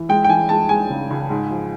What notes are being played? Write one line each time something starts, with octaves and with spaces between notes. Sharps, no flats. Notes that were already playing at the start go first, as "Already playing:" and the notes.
Already playing: E3
G#3 G5
G5
E3 G#5
G#3 A5
G#3 G#5
C#3
C#2
G#2
F3